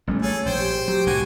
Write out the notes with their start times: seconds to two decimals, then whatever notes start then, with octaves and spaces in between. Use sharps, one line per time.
0.07 A1 G3 A3 C#4
0.22 G#4 A4 C#5
0.46 A#1 C5 G5
0.59 G4
0.88 F#3 G4
1.07 C2 A2 D3 F#4 G#5